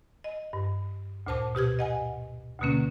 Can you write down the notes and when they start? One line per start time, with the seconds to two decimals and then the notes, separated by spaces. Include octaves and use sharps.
0.24 D#5
0.53 G2
1.27 D2 A#2 C5 A5 D6
1.55 B2 G4 F6 G#6
1.79 D#5 F#5 G#5
2.60 D2 B2 D3 A#3 C#4